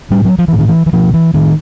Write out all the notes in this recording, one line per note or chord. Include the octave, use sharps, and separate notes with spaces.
A2 G3
F#3
F3
A2 E3
D#3
E3
E3
B2 F3
E3
A2 D#3